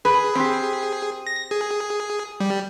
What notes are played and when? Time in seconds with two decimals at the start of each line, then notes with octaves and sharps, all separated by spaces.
0.05 G#4 B4
0.35 C4 G4
1.27 A#6
1.51 G#4
2.40 G3